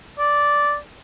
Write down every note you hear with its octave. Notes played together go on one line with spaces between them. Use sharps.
D5